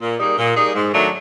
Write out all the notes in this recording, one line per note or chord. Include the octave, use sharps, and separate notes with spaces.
A#2
G3 A#3 D#4 G#4
A#2
G3 A#3 D#4 G#4
G#2
D#3 F#3 A3 D4